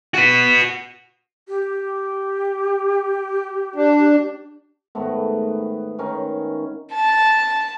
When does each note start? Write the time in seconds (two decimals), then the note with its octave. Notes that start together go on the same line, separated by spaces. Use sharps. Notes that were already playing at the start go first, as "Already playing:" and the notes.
0.14 F#4 B4
1.49 G4
3.76 D4
4.95 G#2 D#3 A3 B3
5.99 D#3 C#4 D#4
6.93 A5